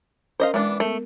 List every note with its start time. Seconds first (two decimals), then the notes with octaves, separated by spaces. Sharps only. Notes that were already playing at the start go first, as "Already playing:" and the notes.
0.40 C#4 A#4 C5 D#5 F5
0.54 E3 G#3 B3 D4
0.80 A3 B3 A#4